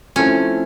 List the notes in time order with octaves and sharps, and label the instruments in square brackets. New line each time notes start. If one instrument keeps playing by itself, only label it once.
[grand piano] F3 A3 C4 E4 A4 [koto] C#4